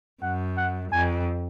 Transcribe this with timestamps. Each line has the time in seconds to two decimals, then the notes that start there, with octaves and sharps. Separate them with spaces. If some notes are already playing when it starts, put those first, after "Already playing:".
0.22 F#2 F#5
0.57 F#5
0.92 F2 G#5